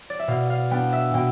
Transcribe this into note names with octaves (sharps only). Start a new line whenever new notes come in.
D5
E5
B2 F5
F5
B3 D4 G5
E5
B2 G5